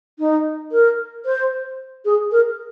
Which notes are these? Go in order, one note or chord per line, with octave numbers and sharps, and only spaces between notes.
D#4
A#4
C5
G#4
A#4